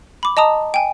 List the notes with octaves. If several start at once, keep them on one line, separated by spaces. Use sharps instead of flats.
B5 D6
D#5 A5 A#5 D#6
G5 G#5